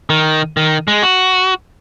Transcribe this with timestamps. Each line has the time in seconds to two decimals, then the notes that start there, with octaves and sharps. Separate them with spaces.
0.10 D#3
0.57 D#3
0.88 G#3
1.03 F#4